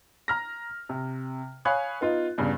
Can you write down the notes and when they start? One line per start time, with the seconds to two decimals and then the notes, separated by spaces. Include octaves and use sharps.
0.28 A#5 F6 A#6
0.89 C3
1.65 C#5 F5 G#5 B5 D#6 F#6
2.01 B3 D#4 F4
2.38 E2 G2 C#3